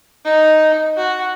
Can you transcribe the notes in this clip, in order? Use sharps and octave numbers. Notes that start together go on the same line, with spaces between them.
D#4
F#4